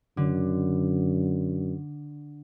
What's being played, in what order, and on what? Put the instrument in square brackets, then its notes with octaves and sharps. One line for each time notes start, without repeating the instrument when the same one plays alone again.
[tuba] F#2 [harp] D3